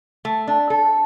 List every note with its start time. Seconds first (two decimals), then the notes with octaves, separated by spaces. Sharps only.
0.25 A3
0.48 D4
0.70 A4